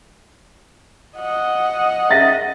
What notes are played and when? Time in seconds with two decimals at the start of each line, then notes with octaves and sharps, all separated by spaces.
1.18 D#5 F#5
2.10 E5 A6 A#6